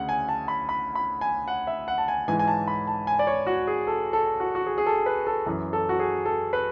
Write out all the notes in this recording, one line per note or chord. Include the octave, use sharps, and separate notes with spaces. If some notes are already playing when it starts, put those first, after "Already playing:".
Already playing: D2 C#3 F#5
G#5
A5
B5
B5
B5
G#5
F#5
E5
F#5
A5
G#5
G#2 E3 G#5
G#5
A5
B5
A5
G#5
D5
C#5
F#4
G#4
A4
A4
F#4
F#4
G#4
G#4
A4
B4
A4
F#2 E3
A4
F#4
G#4
A4
B4